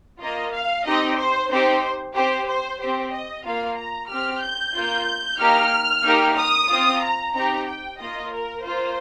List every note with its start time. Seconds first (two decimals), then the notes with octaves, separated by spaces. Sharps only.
0.20 A#3 F4 D#5
0.53 F5
0.86 C4 D#4 G4 D#5
1.17 C5
1.50 C4 D#4 G4 C5
2.15 C4 G4 C5
2.47 C5
2.80 C4 G4 C5
3.13 D#5
3.44 A#3 F4 F5
3.77 A#5
4.09 C4 G4 F6
4.42 G6
4.74 A#3 F4
5.39 A#3 D#4 G4 F6
6.04 A#3 D#4 G4
6.37 D#6
6.69 C4 F4
7.01 A#5
7.34 C4 D#4 G4 A#5
7.67 G5
7.99 A#3 F4 D#5
8.32 A#4
8.63 A#3 F4 C5